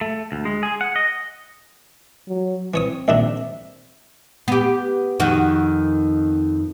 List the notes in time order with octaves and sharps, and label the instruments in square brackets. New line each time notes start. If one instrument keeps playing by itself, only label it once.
[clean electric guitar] A3
D2
G#3
G#4
F#5
D#5
[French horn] F#3
[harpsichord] E3 C#5 D#6 [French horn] C4
[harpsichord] A#1 D#3 D4 [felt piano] E5
[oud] B3 G4
F2 D#3 F#4